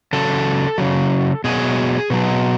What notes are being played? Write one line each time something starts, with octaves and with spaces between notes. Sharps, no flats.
C#3 F#3 A4
C#3 F#3
B2 F#3 G#4
B2 F#3